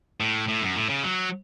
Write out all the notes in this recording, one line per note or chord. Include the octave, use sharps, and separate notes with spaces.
A2
A2
F#2
A2
C#3
F#3